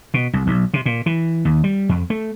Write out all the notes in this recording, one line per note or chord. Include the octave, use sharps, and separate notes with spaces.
B2
C2
B1
C3
A#2
E3
D#2
G3
F2
A3